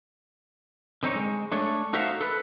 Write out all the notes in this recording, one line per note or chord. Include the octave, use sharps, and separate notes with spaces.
D3 C4 D#4 C#5
G#3
A3 D4 A4 C#5
D#4 F#4 A4 C5 E5 F5
A4 B4